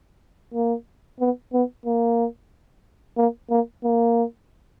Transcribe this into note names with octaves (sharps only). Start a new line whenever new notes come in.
A#3
B3
B3
A#3
A#3
A#3
A#3